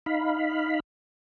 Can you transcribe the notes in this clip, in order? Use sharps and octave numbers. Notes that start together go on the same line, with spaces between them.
D#4 F5 B5